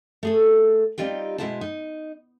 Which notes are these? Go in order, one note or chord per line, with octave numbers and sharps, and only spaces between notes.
A3 G#4 A4
G3 C4 D#4 F4 G4
B2 F#3 G#3 E4 C5 A5
D#4